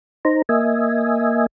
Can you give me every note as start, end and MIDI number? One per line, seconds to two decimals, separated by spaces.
0.25 0.42 63
0.25 0.42 72
0.25 0.42 82
0.49 1.46 58
0.49 1.46 75
0.49 1.46 76
0.49 1.46 80